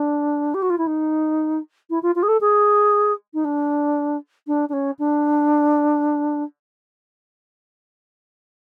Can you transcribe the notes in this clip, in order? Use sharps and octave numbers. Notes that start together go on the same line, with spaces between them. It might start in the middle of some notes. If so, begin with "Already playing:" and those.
Already playing: D4
G4
F#4
F4
E4
D#4
E4
F4
F4
G#4
A4
G#4
D#4
D4
D4
D4
C#4
D4